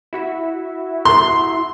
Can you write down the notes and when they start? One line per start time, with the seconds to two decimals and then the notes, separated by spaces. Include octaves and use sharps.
0.13 E4 F#4 E5
1.05 C6